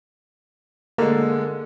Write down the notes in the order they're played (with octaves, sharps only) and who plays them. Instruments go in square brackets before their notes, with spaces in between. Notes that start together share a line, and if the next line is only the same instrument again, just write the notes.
[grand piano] D3 G#3 [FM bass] A#3